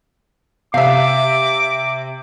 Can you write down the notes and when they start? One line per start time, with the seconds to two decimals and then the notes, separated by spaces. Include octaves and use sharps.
0.74 C3 E5 F5 D6